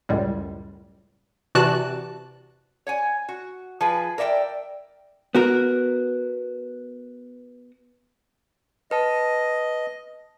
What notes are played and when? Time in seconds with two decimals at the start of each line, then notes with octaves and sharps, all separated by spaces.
0.09 C#2 F#2 A2 G3 G#3
1.55 C3 E3 F#4 D5 A5 F#6
2.87 C#5 F#5 G#5
3.29 F#4
3.81 F3 G#4 B4
4.18 A#4 D5 E5 F#5 G5
5.35 B3 F#4 A#4
8.91 B4 D#5 A5